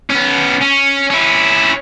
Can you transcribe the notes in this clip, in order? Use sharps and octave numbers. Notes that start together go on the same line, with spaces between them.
B3 C#4
C#4
C#4 E4